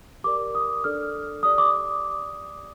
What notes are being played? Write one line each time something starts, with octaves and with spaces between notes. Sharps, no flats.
G4 A#4 D5 D6
D#6
D4 A4 D5 F6
G4 D5 D#6
D6